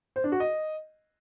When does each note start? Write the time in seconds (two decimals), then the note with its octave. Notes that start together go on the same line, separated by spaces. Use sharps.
0.16 C5
0.24 D4
0.32 F#4
0.40 D#5